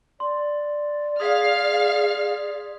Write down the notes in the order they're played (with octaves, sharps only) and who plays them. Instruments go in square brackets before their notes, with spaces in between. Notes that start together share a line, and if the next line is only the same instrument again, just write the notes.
[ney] D5 [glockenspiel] C6
[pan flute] G#4 [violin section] F5 F6 [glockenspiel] D#6 G#6 B6